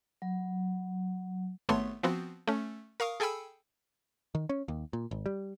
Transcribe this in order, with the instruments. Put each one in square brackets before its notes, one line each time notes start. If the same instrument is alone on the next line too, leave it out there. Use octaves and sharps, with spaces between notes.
[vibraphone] F#3
[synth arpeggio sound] G#1 A3 B3 C#5 C6
F3 B3 C4 F#4
A3 C#4
A#4 F5 C#6 D#6
G#4 A4 G5 G#5 B5 E6
[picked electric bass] D#3
C#4
D#2
A#2
G#1
G3